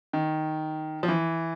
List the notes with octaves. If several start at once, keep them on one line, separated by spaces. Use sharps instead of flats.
D#3
F3
E3